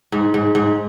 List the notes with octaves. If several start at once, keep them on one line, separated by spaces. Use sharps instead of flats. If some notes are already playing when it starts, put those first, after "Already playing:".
G#2
G#2
G#2